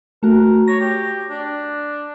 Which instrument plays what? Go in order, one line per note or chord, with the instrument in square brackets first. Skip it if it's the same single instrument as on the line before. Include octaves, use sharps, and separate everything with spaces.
[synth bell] A3 F#4 [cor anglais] A#4
[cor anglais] C#5 [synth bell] A#6
[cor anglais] G4
D4